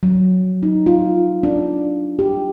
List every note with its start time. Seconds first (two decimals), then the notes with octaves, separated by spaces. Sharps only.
0.03 F#3
0.63 D#4
0.86 F4
1.43 D4
2.19 G4